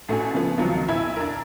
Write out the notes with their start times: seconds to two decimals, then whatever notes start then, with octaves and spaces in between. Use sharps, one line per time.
0.09 A1 A3 D4 F#4 A4 G#5
0.34 C#3 F3 A3 B3
0.58 C#2 C3 D#3 F3 F#3
0.88 B1 E4 E6 G#6
1.16 D4 A#4